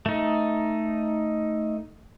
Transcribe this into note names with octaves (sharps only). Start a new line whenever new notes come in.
A3 D#4